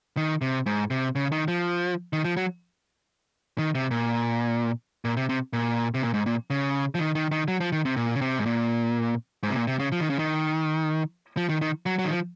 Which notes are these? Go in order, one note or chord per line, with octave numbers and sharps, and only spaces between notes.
D#3
C3
G#2
C3
C#3
D#3
F3
D#3
F3
F#3
D#3
C3
A#2
A#2
C3
C3
A#2
C3
A#2
G#2
A#2
C#3
F3
D#3
D#3
D#3
F#3
F3
D#3
C3
A#2
C#3
C3
G#2
A#2
G#2
C3
A#2
C3
C#3
F3
D#3
C#3
D#3
F3
D#3
D#3
F#3
F#3
D#3
F3